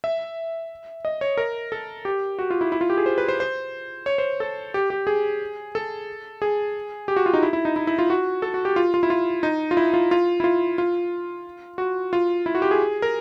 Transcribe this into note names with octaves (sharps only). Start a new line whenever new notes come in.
E5
D#5
C#5
A#4
A4
G4
F#4
F4
E4
E4
F4
G4
G#4
C5
B4
C5
C5
C#5
C5
A4
G4
G4
G#4
A4
G#4
G4
F#4
F4
D#4
E4
E4
D#4
E4
E4
F4
F#4
A4
F#4
G4
F4
F4
E4
F4
D#4
F4
E4
F4
F4
E4
F4
F4
F#4
F4
E4
F#4
G4
G#4
A#4